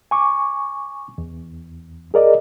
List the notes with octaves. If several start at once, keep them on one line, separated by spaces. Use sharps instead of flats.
G#5 C#6 D6
E2
G#4 A#4 D5 D#5